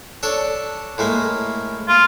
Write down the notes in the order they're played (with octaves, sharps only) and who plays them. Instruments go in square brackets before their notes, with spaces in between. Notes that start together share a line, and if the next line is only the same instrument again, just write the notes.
[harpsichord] D4 A4 C#5
A2 G#3 A#3
[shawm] F4